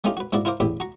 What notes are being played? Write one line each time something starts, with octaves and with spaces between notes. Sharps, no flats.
A3 A#3 C#4 D#4 F4 G4
F#4 B4
G#2 A#3 E4 F#4 D5
E4 F4 A#4 C5 F5 D6
A1 E2 D3 G4 B5
F#4 A#5 C#6